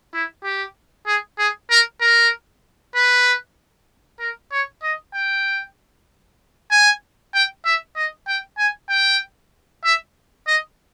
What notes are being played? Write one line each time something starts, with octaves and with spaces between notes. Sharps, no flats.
E4
G4
G#4
G#4
A#4
A#4
B4
A#4
C#5
D#5
G5
G#5
G5
E5
D#5
G5
G#5
G5
E5
D#5